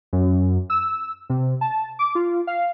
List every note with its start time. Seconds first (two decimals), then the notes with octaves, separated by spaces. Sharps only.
0.13 F#2
0.70 E6
1.30 C3
1.61 A5
1.99 D6
2.15 F4
2.47 F5